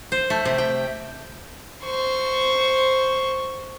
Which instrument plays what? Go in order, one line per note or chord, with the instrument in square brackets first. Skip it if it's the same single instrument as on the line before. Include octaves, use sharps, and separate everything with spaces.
[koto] C5
A3
C3
G5
[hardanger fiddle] C5 C#6